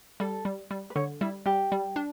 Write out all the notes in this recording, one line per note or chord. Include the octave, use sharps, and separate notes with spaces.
G3 A4
G3
G3
B4
D3 C#5
G3 E4
G3 G4
G3
D4